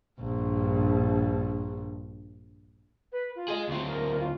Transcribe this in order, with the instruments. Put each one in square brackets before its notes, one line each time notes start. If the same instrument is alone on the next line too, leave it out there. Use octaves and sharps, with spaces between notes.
[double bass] A#1 G2
[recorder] B4
F4
[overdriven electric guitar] G#4 D#5
D2 C4
[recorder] A#4
F4